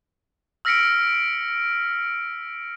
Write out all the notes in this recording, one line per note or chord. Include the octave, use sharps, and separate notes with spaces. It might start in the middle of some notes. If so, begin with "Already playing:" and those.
E6 F6 A#6 B6 C#7 D7